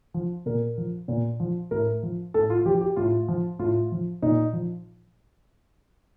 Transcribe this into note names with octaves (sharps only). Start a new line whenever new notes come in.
F3
A#2 A#4
F3
A#2
F3
A2 A#4
F3
A2 A4
F4
F3 G4
G4
A2 F4
F3
A2 F4
F3
A#2 D#4
F3